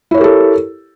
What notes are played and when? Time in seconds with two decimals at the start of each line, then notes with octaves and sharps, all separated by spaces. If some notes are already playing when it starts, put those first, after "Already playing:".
0.11 E4
0.14 C#5
0.18 A#4
0.21 G4
0.24 A4